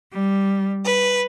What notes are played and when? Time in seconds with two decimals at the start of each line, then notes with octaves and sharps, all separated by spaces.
0.12 G3
0.83 B4